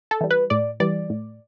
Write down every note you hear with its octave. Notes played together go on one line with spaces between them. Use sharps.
A4
E3 G3
B4
A2 D5
E3 G3 D5
A2